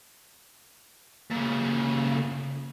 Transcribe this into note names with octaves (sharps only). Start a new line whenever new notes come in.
A#2 C#3